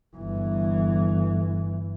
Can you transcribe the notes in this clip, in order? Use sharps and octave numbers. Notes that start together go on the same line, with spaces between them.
G1 E3